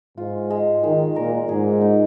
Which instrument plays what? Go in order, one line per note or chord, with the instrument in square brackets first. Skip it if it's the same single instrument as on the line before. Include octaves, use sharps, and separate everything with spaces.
[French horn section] G#2 [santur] F4
[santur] G#3
[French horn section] D#3 [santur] G#3
[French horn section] A#2 [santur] A#4
[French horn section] G#2 [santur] G#4
[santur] D#4